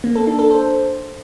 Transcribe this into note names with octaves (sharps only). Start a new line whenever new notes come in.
A#3
A4
D4
A4
C5